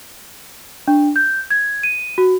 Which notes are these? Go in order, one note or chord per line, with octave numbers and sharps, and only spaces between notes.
D4
G6
G#6
D#7
F#4